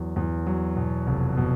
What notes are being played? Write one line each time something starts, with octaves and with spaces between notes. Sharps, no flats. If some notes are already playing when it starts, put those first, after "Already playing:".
Already playing: E2 F#3
E2
F#3
B2
F1
B2